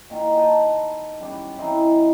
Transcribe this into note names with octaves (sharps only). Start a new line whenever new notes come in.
A#2 D#3
A#4 B4 G5 A5
F#2 G3 B3 D6
E3 F#3 C4 D#4